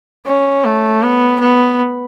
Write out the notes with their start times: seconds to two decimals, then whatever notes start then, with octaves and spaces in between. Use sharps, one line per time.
0.26 C#4
0.65 A3
1.02 B3
1.40 B3